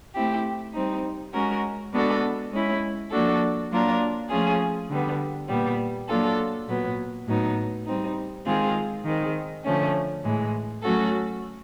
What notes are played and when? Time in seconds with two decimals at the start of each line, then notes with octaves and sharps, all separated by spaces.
0.15 A3 C4 E4 G4
0.74 G3 C4 D#4
1.33 G#3 C#4 F#4 A#4
1.93 G#3 B3 D4 F#4 A4
2.53 G#3 C#4 E4
3.11 F3 A#3 D4 F#4 A4
3.71 F#3 A#3 D4 F4 A#4
4.30 F3 A3 C#4 F4 G#4
4.90 D3 G3 B3
5.49 A#2 G3 B3
6.08 F#3 A#3 D4 F4 A4
6.67 A#2 F#3 B3
7.27 A2 F#3 B3 D#4
7.86 G3 C4 D#4
8.46 D#3 G#3 C4 F4 G#4
9.05 D#3 G#3 C4
9.64 D3 F3 A3 C#4
10.24 A2 E3 G#3
10.82 F#3 A3 C#4 F#4 A4